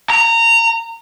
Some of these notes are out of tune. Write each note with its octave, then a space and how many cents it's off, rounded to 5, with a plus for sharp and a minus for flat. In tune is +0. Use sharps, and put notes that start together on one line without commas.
A#5 -20